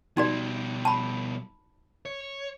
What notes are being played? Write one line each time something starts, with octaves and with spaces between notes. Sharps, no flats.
B2 G3 D#4 F#4 D5
A5 B5
C#5